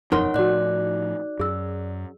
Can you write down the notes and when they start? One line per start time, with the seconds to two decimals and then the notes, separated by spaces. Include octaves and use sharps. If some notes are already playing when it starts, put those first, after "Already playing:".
0.12 E1 F#2 F3 D#4 A#4 C#5 F#5 C6
0.34 A2 F3 F#4 C#5 D5 F#6
1.39 F#2 G#4 E6